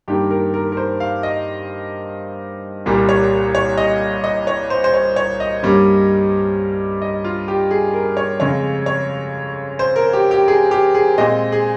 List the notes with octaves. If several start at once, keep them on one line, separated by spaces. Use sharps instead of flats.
G2 D#3 A#3 G4
A#4
A#4
A#4
C5
F5
D#5
C2 A#2 G3 A#3
C#5
C#5
D#5
D#5
C#5
C5
C5
C#5
C#5
D#5
G2 G3 A#3 C#4
D#5
F4
G4
G#4
A#4
C#5
F2 C#3 G#3 C#4 C#5
C#5
C5
A#4
G4
G4
G#4
G4
G#4
A#2 G#3 C4 D#5
G#4